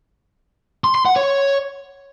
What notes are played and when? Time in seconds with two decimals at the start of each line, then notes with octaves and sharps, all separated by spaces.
0.84 C6
0.95 C6
1.05 F#5
1.16 C#5